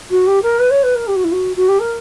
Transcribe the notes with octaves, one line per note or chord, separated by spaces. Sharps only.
F#4
G4
A#4
B4
C#5
B4
A#4
G4
F#4
E4
F#4
F#4
G4
A#4